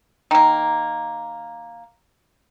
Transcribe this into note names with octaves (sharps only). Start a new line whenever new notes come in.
D#3 A#3